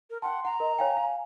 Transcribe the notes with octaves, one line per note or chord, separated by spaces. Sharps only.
A#4
F#5 G5 A5 C6
F#5 A#5
A#4 D#5
C#5 F5 G5 G#5
F5